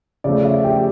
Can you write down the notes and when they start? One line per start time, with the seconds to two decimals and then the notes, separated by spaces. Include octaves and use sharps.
0.24 C#3 F3 A3 D5
0.45 E5
0.64 G4 G5